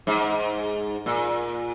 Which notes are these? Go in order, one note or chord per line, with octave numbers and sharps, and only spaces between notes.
G#2
A#2